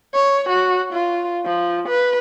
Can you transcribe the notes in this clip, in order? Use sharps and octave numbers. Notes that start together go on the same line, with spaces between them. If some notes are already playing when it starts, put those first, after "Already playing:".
C#5
F#4
F4
F3
B4